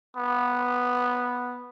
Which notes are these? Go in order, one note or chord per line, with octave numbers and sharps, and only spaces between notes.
B3